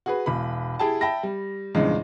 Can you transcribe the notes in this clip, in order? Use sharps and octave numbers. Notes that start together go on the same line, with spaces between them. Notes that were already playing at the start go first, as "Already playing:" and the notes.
F#4 G#4 B4
E1 B5
E4 G4 G#4 G5 A5
E5 G5 A5 B5 A#6
G3
A#1 E2 G2 C#3 G#3